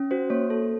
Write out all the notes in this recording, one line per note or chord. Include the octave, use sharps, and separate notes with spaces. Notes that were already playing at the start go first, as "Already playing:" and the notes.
Already playing: C#4
F#4 C5
A#3 C#5
A4